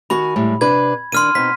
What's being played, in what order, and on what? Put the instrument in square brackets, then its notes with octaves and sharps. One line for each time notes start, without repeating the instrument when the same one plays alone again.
[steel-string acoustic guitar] D#3 F#4 G#5 [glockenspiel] B5
[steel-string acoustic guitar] A2 G3 G#3
[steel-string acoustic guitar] C3 D4 B4 [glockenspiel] G#6
[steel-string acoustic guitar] D#3 D4 [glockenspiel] C6 F6 D#7
[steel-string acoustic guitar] B2 C4 D#4 [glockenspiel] B6